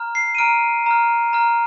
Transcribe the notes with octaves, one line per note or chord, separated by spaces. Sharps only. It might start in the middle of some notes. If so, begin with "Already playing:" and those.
Already playing: A#5 F6
C7
D#7
A#5 F6 D7
A#5 F6
A#5 F6